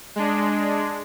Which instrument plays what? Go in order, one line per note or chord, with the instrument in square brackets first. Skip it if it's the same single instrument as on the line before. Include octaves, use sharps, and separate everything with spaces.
[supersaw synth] G#3 D4